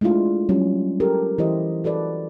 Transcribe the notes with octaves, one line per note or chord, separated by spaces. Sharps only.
G#3 A3 D4 E4 F4
F#3 G3 C#4
G4 A4 A#4
E3 E4 G4 C5 D#5
F#4 A4 B4 D5